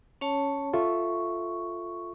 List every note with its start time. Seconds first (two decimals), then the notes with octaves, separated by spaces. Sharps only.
0.21 C#4 C#5 A5
0.73 F4 A4 E5 C#6